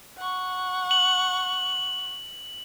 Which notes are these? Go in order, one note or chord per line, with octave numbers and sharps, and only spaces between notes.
F#5 C#6
F#7